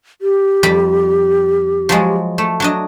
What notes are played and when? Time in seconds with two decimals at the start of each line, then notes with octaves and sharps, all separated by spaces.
0.22 G4
0.63 F2 G3 B5
1.89 F3 F#3 G#3
2.38 A3
2.60 F#3 D4 D#5